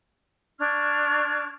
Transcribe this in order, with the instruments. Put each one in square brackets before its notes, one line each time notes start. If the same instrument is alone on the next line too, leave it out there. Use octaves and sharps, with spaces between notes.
[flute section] D4 C#6 F6 G#6